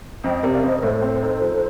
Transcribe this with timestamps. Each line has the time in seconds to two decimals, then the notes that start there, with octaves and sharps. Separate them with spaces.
0.24 F2 D#5 G5
0.43 C3 A#4 D5
0.55 F5
0.64 F2 C5 D#5
0.79 A#4
0.83 A2 A4 C5
1.02 C4
1.22 D#4
1.42 F3